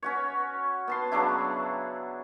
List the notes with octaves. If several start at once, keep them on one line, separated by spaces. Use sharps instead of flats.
C#4 F#4 C#5
B3 A5 C6
C#3 F#3 D4 E4